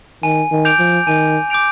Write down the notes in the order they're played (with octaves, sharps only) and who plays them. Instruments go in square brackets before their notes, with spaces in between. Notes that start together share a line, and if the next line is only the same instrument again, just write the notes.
[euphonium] D#3 [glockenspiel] G#5
[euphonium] D#3
[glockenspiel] D6 G6 D7 F7
[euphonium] F3
[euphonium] D#3 [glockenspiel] G#5
[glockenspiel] D6 G6 D7 F7